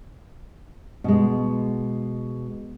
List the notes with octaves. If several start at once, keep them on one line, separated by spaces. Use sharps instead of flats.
B2 G#3